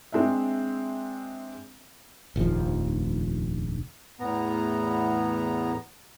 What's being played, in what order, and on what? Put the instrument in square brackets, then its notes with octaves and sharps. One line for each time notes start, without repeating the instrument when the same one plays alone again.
[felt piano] G#3 C4 D4 E5
[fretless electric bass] F1 A#1 D#2 F3
[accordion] E2 A2 B3 A#5